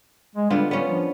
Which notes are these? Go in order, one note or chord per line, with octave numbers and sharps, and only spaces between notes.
G#3
D3 G3 B3 F4
G3 B3 C#4
F3